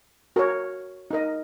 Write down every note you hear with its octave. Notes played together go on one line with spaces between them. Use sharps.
F#4 A#4 C#5
D#4 A#4 D#5